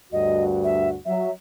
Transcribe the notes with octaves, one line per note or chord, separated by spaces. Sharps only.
D2 G2 F#4 D#5
E5
F#3 E5